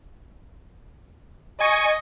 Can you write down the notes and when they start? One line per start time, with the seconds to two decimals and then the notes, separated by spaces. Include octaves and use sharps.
1.60 D#5 G#5 C#6